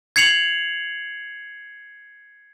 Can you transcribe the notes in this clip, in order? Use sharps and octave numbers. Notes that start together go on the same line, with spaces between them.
G#6 C7 C#7 F7 F#7